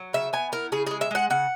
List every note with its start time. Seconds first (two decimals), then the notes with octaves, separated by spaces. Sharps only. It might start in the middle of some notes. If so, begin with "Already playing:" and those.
Already playing: F#3
0.13 C#3 E5
0.33 B3 G#5
0.52 E4 A#4
0.72 C#3 G#4
0.87 G#3 G#4
1.01 E5
1.11 G#3 F#5
1.30 C#3 F#5